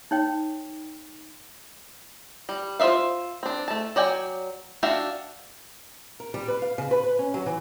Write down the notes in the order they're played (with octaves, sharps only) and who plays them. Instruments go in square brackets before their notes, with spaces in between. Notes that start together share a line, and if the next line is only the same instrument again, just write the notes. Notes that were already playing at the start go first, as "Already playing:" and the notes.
[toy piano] D#4 C#5 G5
[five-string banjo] G3
F4 C5 D5 E5 F5
C4 D4
A3 A5
F#3 D5 G5 G#5
D4 F#4 E5 F5 G5
[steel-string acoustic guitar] A#4
G3
B4
F5
C#3
B4
B4
C#4
F#3
E3